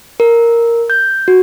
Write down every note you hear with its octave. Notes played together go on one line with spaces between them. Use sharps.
A#4
G6
F#4